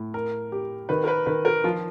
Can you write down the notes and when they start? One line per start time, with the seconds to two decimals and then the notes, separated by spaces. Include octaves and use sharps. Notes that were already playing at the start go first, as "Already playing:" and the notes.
Already playing: A2
0.14 A#4
0.52 G4
0.89 D#3 B4
1.04 A#4
1.08 B4
1.26 D#3 B4
1.45 A#4
1.64 F3 F4